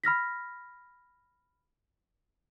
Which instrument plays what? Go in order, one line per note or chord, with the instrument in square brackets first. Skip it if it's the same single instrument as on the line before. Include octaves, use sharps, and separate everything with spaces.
[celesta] B5 F6 A#6 B6